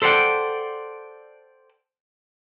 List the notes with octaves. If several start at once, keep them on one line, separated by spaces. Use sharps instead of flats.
A4 C5 D5 E5 F#5 G5